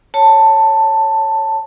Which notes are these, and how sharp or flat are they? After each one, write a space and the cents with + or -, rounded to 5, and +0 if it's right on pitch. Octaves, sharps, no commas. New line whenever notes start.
C#5 +0 A5 +10